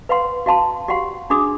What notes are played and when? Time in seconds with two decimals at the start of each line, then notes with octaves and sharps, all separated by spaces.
0.09 B4 F5 F#5 C6
0.46 F#4 F5 A5 C6
0.88 F#4 G4 F5 F#5 C6
1.30 D4 F#4 G#4 D6 D#6